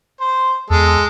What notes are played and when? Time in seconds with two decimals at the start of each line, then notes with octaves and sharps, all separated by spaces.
0.20 C5
0.70 E2 G#3 A4